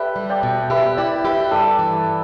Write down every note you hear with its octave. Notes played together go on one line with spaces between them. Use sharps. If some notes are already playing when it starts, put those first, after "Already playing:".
Already playing: G4 A4 B4 D5 E5 G5
G3
D5 G5
B2
G4 B4 E5
E4 D5 G5
G4 B4 E5
G2 A4 D5
E3